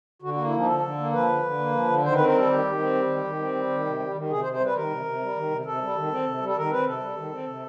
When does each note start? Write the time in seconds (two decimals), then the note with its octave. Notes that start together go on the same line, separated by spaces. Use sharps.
0.22 D3 F#4
0.34 A#3 F#4
0.45 E4
0.53 F3 D#4
0.67 D3 A4
0.82 D3
0.98 A#3
1.13 F3 B4
1.29 D3
1.43 D3
1.58 A#3
1.73 F3
1.88 D3
2.03 D#3 C5
2.10 A#4
2.14 C4 B4
2.26 A#4
2.34 G3 A4
2.49 D#3 G4
2.64 D#3
2.79 C4
2.94 G3
3.09 D#3
3.24 D#3
3.39 C4
3.54 G3
3.70 D#3
3.85 C3
4.00 G3
4.15 D#3
4.29 C3 G#4
4.41 C5
4.45 C3
4.52 C5
4.60 G3 B4
4.75 D#3 A#4
4.90 C3
5.05 C3
5.21 G3
5.36 D#3
5.51 C3
5.66 C3 A4
5.81 G3
5.96 D#3
6.11 C4
6.26 C3
6.41 G3
6.49 A4
6.57 D#3 A#4
6.71 C4 B4
6.86 C3 A4
7.01 G3
7.17 D#3
7.31 C4
7.47 C3